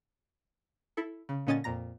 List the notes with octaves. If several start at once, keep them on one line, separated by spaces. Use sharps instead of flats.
E4 A4
C#3
A#2 D3 C#4 D#5 G#5 A6
F2 A#2 A#5 A#6